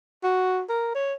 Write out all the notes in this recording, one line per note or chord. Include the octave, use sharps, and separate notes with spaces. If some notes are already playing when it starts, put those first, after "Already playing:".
F#4
A#4
C#5